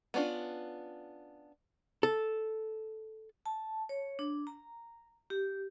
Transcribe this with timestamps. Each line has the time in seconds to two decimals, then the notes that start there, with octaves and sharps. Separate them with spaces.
0.14 B3 C#4 D4 F4
2.03 A4
3.46 A5
3.89 C#5
4.19 D4
4.47 A#5
5.30 G4